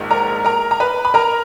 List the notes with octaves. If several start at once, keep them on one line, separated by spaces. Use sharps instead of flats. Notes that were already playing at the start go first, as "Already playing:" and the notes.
Already playing: A#1 G#2 D#3
A#4 A#5
A#4 A#5
A#5
B4 B5
B5
A#4 A#5